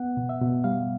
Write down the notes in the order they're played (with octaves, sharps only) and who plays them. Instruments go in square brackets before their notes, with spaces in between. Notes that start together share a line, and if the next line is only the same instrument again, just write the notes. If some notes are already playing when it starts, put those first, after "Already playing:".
Already playing: [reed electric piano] B3 F#5
B2
E5
B2
G3 F5